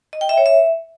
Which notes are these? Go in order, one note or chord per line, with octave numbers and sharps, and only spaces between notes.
D#5
G5
E5
C#5
E5